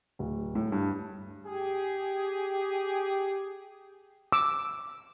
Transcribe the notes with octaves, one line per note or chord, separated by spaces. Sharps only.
D1
A2
G2
G4 G#4
D6 E6